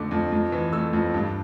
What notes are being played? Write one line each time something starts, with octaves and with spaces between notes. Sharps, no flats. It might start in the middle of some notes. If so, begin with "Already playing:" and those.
Already playing: F2 D3 A3 D6
F2
F2
E3
A3 E6
F2
G2